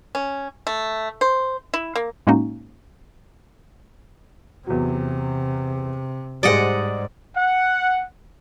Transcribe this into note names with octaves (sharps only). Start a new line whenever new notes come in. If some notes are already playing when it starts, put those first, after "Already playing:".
C#4
A3
C5
E4
A#3
A2 G#3 A#3 C#4 D#4 F#4
E2 C3 F#3
G#2 G3 G#4 C5 D5 D#5 F#5
F#5